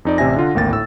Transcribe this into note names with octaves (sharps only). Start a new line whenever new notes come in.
F2 D#4 D5
A1 C3 D5 E5 G#5 A#6
D3 F4 F#5
G#1 D2 A#3 G5 A6
A2 E6